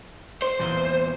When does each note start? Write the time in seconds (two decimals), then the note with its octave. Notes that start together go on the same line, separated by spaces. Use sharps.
0.42 C5
0.59 E2 A#2 E3